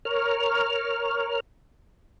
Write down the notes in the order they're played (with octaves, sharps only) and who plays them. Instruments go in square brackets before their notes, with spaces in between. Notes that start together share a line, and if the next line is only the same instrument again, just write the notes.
[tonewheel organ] A#4 C#5 F6